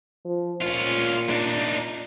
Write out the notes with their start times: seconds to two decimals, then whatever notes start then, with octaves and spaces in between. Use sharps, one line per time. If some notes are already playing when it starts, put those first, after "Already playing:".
0.25 F3
0.62 A#2 C#4 F4
1.30 D4 D#4